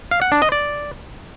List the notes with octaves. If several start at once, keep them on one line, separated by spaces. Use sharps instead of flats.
F5
F#5
D4
D#5
D5